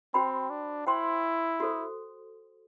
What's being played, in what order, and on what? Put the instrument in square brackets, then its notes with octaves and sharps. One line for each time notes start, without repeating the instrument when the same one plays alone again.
[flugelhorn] C4 [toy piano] F#4 C5 G5 B5
[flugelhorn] D4
[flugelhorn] E4 [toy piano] C5 G5 C6
[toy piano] F#4 A4 C5